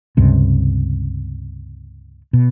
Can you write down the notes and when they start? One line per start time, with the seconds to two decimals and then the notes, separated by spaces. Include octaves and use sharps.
0.17 C#2 G2 C3
2.33 B2